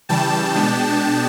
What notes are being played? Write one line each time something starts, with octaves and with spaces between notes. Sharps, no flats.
C#3 E3 G3 G5 A5
B2 G#3 B3 D4